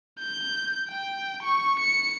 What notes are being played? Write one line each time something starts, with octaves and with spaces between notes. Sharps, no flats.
G6
G5
C#6
C#7